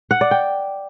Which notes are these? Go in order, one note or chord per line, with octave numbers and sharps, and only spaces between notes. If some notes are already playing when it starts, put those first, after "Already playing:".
F#5
D5
G5